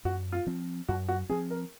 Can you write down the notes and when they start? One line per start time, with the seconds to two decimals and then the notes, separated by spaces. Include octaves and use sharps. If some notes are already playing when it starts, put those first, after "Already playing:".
0.05 F#2 F#4
0.32 F4
0.47 F3 C4
0.88 F#2 F#4
1.08 F#4
1.29 F3 C4 G#4
1.50 A#4